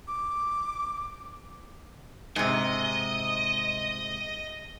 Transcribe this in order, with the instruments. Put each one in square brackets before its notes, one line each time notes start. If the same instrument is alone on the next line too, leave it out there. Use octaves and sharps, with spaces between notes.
[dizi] D6
[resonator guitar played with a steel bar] G#2 C3 [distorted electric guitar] D#5